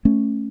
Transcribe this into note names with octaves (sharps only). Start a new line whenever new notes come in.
A3 C#4